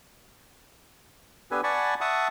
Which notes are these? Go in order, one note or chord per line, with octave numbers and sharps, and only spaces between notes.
B3 D4 G4 A4 B4 G#5
D5 F#5 G#5 A5 B5 C#6
E5 F#5 A5 C#6 D#6